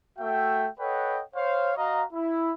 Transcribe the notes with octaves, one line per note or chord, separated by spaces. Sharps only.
A3 F#4 E5 G5
A4 B4 C#5 D#5 F#5 G5
C5 C#5 F5
F#4 D#5 F5 A#5
E4